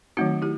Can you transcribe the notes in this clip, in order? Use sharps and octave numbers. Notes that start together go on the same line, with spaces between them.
D#3 F#3 A3 C4 D#4 F#4
E4 G4